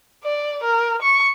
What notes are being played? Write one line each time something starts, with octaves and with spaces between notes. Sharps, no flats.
D5
A#4
C#6